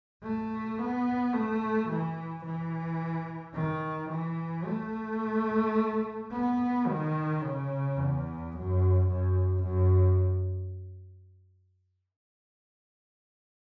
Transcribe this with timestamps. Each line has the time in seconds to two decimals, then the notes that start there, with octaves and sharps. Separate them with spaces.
0.23 A3
0.79 B3
1.33 A3
1.90 E3
2.45 E3
3.54 D#3
4.11 E3
4.65 A3
6.32 B3
6.86 D#3
7.42 C#3
7.97 E2
8.53 F#2
9.08 F#2
9.63 F#2